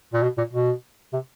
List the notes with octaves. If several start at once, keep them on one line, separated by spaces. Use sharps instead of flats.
A#2
B2
A#2
B2
C3